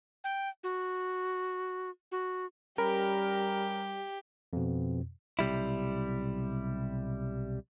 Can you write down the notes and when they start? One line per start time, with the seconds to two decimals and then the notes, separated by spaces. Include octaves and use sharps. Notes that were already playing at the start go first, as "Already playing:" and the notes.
0.24 G5
0.63 F#4
2.12 F#4
2.78 G3 C#4 G4 A#4 B5
4.53 F2 B2
5.39 B1 C3 G3 E4